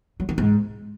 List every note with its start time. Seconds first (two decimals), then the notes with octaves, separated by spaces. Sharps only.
0.20 F#3
0.29 D#3
0.38 G#2